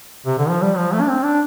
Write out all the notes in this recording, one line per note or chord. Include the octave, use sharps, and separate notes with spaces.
C3
D3
F3
G3
F3
A3
D4
C4
D4